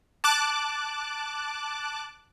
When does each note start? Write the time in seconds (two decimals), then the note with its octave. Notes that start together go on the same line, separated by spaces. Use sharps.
0.24 A5 D6 F#6